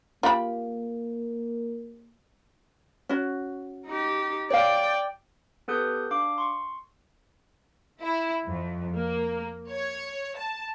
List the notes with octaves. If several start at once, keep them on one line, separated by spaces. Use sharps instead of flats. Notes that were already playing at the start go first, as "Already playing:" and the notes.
A#3 F4 G4 B5
C#4 F#4
D#4 G4
C#5 D5 F5 G5
B3 G4 A4 B4 D#6 G6
D4 F5 D6
C6 C#6
E4
F2
A#3
C#5
A5